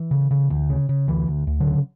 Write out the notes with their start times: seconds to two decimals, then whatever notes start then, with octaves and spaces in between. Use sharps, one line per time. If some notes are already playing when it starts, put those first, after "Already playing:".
Already playing: E3
0.11 C#3
0.31 C#3
0.50 D2
0.69 C#3
0.89 C#3
1.08 D2 E3
1.28 D2
1.47 D2
1.60 D3 F#3
1.66 C#3